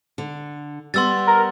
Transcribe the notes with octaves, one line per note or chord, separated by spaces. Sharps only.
D3
G3 B3 C6 E6 A6
A#4